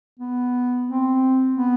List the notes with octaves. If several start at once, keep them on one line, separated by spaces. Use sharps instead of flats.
B3
C4
B3